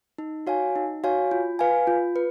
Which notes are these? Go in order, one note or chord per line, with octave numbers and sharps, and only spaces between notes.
D#4
F#4 C#5 F5 G#5
D#4
F#4 C#5 F5 G#5
F4
B4 F5 G#5
F4
B4